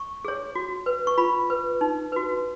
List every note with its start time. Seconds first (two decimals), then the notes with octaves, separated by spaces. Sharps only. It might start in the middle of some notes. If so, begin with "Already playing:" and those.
Already playing: C#6
0.25 G#4 C#5
0.55 F#4
0.86 B4
1.07 C#6
1.18 F4 B5
1.50 B4
1.81 D#4
2.12 F#4 B4